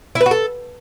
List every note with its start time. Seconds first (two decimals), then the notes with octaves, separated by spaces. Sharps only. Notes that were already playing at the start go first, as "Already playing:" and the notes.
0.15 E4
0.21 B4
0.26 F#4
0.31 A4